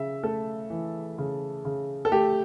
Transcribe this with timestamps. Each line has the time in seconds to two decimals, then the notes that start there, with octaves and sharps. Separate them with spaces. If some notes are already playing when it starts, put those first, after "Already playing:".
Already playing: C#3 E5
0.23 A3 A4
0.70 E3
1.18 C#3
1.65 C#3
2.05 A4
2.12 A3 G4